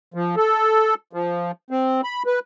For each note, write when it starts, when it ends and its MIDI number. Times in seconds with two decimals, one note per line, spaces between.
0.14 0.35 53
0.37 0.94 69
1.13 1.51 53
1.70 2.01 60
2.04 2.23 83
2.26 2.40 71